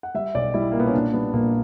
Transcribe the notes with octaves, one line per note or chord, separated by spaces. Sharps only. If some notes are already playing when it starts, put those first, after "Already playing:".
F#5
G3 E5
B1 D5
G3 E4
A#2 A#3
B3
C#4
A#2 D4
G3 B3
A#1 A#3